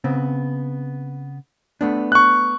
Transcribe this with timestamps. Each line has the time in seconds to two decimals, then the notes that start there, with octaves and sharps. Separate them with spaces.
0.04 C#3 B3 C4
1.81 A3 B3 D4
2.12 C#6 F#6